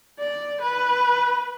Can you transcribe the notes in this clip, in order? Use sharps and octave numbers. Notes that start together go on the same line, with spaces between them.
D5
B4